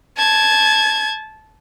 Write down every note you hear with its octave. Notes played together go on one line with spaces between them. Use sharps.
A5 G#6